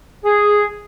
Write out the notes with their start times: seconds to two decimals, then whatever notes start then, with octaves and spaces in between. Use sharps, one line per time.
0.24 G#4